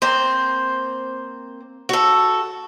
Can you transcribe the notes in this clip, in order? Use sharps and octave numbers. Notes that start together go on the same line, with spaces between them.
A#3 C4 C5
F#4 A4